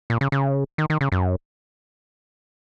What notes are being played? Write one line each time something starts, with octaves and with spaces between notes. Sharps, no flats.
A#2
C#3
C#3
D#3
D#3
C#3
F#2